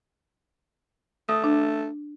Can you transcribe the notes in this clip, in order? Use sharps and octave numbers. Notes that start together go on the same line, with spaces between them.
A3 D#6
D4